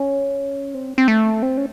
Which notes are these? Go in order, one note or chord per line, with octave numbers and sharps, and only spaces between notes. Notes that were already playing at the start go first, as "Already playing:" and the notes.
Already playing: C#4
C4
C4
A3
C4
C#4